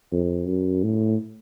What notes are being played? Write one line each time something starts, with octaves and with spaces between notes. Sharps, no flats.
F2
F#2
A2